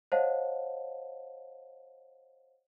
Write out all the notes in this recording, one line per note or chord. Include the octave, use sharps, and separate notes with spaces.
C5 C#5 D#5 F5 F#5 A5